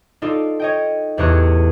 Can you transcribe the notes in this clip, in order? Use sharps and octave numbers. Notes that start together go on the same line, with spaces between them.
D#4 F4 A4 D5
C#5 D#5 G5
A1 E2 G4 C#5 A#5 F#6